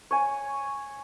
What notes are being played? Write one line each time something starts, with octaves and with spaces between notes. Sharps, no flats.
C#5 G#5